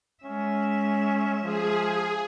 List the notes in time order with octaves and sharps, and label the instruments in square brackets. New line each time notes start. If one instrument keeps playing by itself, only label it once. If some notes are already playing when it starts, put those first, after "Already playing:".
[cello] G#3 E5 [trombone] C#4
[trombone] F3 [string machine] G#4